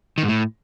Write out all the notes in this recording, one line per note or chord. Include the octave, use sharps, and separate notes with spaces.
D#3
G#2
A2